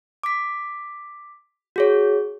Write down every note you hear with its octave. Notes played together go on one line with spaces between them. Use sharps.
D6 B6
F#4 G#4 C#5